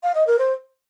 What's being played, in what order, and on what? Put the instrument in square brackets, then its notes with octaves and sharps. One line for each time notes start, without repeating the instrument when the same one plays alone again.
[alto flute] F5
D#5
A#4
C5